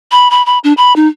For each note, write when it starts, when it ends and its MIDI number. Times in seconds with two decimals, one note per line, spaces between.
0.12 0.29 83
0.31 0.44 83
0.46 0.58 83
0.64 0.73 62
0.77 0.95 83
0.96 1.08 63